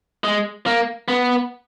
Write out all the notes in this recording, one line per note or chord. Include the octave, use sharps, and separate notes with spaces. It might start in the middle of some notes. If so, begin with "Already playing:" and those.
G#3
A#3
B3